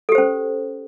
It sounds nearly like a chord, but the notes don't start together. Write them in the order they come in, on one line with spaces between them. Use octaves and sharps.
A4 G4 C5 C#4